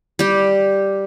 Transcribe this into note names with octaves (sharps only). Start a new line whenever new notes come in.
G3 G4